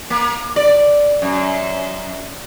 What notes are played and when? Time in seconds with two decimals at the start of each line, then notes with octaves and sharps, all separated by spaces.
0.10 A#3
0.56 D5
1.22 F#2